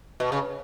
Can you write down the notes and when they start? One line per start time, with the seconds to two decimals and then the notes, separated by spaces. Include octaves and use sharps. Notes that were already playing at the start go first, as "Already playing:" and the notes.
0.20 B2
0.32 C#3